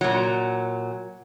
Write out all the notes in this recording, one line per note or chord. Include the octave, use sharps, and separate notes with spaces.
A#2 F#3